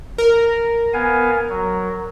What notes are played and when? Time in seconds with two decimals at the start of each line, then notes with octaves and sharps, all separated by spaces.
0.18 A#4
0.94 B3 F5 G#5
1.50 F#3